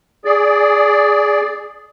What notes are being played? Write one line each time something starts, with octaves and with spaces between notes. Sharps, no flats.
G#4 D5